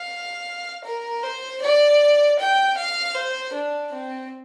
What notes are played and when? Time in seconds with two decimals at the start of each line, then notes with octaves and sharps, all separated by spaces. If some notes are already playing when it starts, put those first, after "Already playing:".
Already playing: F5
0.84 A#4
1.23 C5
1.61 D5
2.39 G5
2.77 F5
3.15 C5
3.53 D4
3.93 C4